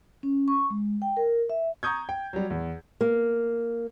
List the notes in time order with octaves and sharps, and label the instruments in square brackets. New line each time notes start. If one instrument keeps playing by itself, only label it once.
[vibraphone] C#4
C#6
G#3
G5
A#4
E5
[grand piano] A#5 C#6 D#6 G6 G#6
G5
F#3 G3
E2
[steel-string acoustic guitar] A#3